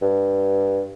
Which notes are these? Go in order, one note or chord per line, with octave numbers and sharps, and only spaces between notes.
G2